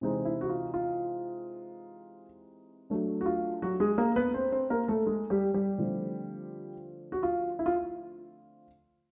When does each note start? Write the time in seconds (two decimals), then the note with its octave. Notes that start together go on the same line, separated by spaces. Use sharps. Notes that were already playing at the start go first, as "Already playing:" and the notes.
0.01 C3 E3 G#3 C4 D#4
0.25 E4
0.41 F#4
0.49 F4
0.74 F4
2.90 F#3 A3 D4
3.21 F#4
3.26 F4
3.62 F#3 F#4
3.80 G#3 G#4
3.98 A#3 A#4
4.16 B3 B4
4.34 C4 C5
4.52 C4 C5
4.70 A#3 A#4
4.88 A3 A4
5.06 G#3 G#4
5.30 G3 G4
5.54 G3 G4
5.78 D3 F3 A3 C4
7.12 F#4
7.23 F4
7.59 E4
7.66 F4